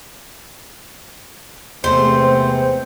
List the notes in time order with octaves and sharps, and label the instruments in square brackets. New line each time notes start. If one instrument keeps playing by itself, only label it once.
[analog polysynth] E2 C3 [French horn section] G#3 B3 C4 [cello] A3 [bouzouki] C5